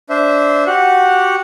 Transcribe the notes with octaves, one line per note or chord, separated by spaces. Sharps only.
D4 C5 E5
F#4 G4 F#5